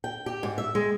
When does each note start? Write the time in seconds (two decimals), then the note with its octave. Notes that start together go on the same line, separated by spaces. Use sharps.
0.04 G5
0.26 G4
0.43 G#2
0.58 E5
0.75 G#3